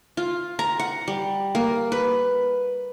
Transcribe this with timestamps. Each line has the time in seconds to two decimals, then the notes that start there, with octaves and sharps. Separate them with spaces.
0.17 F4
0.59 A#5
0.79 F#5
1.08 G3
1.55 A#3
1.92 B4